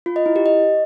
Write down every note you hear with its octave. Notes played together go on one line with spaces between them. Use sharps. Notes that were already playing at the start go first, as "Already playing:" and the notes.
F4
D#5
E4
G4
D#5